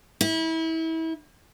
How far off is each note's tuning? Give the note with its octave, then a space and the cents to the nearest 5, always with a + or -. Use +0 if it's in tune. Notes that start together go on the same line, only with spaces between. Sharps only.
E4 -30